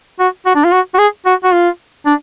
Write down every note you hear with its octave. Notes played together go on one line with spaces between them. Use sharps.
F#4
F#4
D4
F4
F#4
F#4
G#4
F#4
F#4
F4
D4